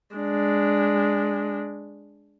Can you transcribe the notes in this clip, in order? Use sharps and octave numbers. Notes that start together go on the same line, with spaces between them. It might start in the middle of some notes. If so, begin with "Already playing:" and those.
G#3 D4